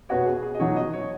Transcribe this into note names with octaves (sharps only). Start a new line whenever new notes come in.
B2 B3 F#4 C#5
G#4
G#4
D#5
B2 F#3 D#4 F#4 C#5
D#5
C#5